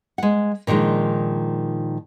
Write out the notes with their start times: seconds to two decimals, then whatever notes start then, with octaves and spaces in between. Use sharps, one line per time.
0.18 G#3 F#5
0.67 A#2 D#3 F3 G#3 D4